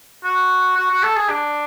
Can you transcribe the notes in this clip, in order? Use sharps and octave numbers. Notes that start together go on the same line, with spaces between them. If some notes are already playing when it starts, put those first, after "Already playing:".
F#4
F#4
F#4
A4
G#4
D4